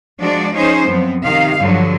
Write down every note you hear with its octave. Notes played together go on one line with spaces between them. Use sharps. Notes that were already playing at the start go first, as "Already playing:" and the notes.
F3 G#3 D4 F#4 D5
C#4 D#4 G#4 C5
F#2 F3 B3 C4
C3 D#3 F5
G2 D3 F3 F#3